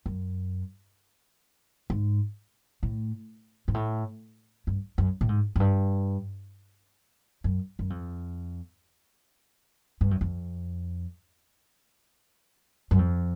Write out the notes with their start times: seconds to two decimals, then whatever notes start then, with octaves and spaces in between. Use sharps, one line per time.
0.06 F#2
1.90 G#2
2.83 A2
3.68 G#2
3.74 A2
4.67 G2
4.98 F#2
5.21 A2
5.29 G#2
5.56 F#2
5.60 G2
7.44 F#2
7.79 F#2
7.90 F2
10.01 G2
10.11 F#2
10.21 F2
12.91 F#2
12.99 F2